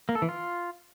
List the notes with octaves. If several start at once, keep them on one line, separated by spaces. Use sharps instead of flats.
A#3
A4
E3
F4